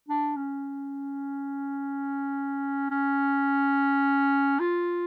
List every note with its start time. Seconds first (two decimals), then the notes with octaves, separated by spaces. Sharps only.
0.08 D4
0.36 C#4
2.91 C#4
4.60 F4